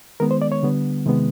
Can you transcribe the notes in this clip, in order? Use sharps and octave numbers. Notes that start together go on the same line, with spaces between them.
D#3 G#3 B3 A#4
C5
D5
C#5
D3 G3 B3
C3 D#3 G#3 B3